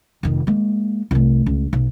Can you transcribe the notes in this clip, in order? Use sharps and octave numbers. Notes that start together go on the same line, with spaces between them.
F1 D#3
G#3 A#3
C2 A3
C#2
B1